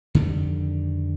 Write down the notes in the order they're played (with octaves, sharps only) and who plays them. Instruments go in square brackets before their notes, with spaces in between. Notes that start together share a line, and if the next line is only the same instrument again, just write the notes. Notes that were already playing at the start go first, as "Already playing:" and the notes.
[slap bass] F2 D3 D#3 G3